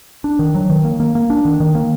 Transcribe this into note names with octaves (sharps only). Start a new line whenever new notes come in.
D4
D#3
F#3
D#3
A#3
A#3
A#3
D4
D#3
D#3
A#3